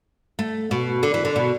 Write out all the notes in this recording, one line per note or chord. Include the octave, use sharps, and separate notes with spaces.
A3
B2
D3
E3
D3
B2